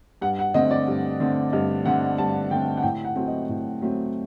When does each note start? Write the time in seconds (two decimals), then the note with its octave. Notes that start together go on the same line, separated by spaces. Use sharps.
0.21 G2 F#5
0.39 F#5
0.54 D3 A3 C4 D#5
0.71 D5
0.88 G2
1.20 D3 A3 C4
1.53 G2 D#5
1.85 D3 A3 C4 F#5
2.18 G2 A5
2.51 D3 A3 C4 G5
2.77 F#5
2.83 A2 G5
3.05 F#5
3.16 F#3 A3 C4
3.27 D#5
3.49 A2
3.81 F#3 A3 C4